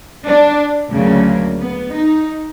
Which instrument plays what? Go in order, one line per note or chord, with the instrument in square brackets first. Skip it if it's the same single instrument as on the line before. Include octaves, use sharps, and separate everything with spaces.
[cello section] D4
D2 C#3 F#3 A#3
B3
D#4